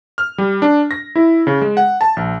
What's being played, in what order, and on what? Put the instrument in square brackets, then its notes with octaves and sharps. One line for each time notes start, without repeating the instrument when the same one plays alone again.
[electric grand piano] F6
G3
D4
A#6
E4
C#3
G#3
F#5
A5
A#1